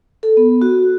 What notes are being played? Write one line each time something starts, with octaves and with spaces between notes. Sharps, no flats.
A4
B3
F#4